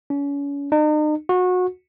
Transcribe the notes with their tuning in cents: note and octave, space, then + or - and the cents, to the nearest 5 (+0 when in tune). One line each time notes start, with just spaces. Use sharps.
C#4 +35
D#4 -40
F#4 -25